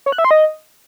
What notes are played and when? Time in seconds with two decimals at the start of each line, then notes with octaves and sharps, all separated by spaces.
0.06 C#5
0.12 F#6
0.18 E5
0.25 C6
0.31 D#5